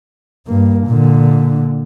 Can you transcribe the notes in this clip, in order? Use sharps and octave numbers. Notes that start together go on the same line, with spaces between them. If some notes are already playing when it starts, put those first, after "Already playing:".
G2 A#3
A#2 D3